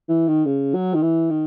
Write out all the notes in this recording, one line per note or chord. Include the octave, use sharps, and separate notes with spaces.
E3
D#3
C#3
F#3
D#3
E3
D#3